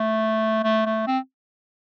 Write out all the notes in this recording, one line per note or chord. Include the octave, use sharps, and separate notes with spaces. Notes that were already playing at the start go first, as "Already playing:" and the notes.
Already playing: A3
A3
A3
C4